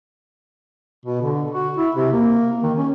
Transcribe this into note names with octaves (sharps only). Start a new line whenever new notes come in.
B2
D3
F#4
E4
C3
A#3
D#3
C#4